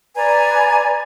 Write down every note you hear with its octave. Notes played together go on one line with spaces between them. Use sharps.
B4 D5 G#5 A#5